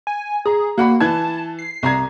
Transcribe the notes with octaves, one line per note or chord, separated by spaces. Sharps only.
G#5
G#4 A#5
A#3 F#4 F#5 B5
E3 A5 G#6
C7
C2 A#5 G#6